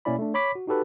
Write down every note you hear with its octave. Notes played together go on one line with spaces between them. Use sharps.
B2 A#3 C#4 E4 D5 B5
A3 D4
C#5 B5 D6 B6
F#4
D#4 F#4 G4 A4 B4